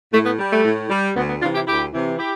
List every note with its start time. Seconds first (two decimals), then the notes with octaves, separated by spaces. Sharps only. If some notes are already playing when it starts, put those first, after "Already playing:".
0.13 A2 A3
0.25 B3
0.39 G3
0.50 A3
0.65 A2
0.89 G3
1.15 D2 B3
1.29 B3
1.41 C3 E3 D4 F4
1.54 E4 G4
1.67 D2 E4 G4
1.93 C3 E3
2.18 E4 G4